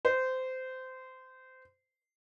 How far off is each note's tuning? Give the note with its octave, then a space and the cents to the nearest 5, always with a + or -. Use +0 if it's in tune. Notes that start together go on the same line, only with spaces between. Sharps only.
C5 -20